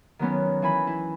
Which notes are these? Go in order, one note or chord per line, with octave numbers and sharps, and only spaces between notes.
D#3 F#3 B3 C#4
E3 G#5 B5
E4